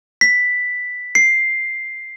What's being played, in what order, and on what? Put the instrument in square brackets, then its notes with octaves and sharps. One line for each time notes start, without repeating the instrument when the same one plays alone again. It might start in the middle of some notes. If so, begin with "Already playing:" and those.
[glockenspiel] B6
C7